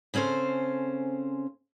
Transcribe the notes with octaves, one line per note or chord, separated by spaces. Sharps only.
C#3 C4 C#4 A4 C5